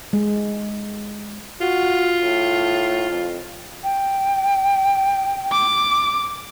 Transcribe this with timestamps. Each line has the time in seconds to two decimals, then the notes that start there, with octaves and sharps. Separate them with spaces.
0.13 G#3
1.61 F4 F#4
2.21 A2
3.10 F2
3.84 G5
5.52 D6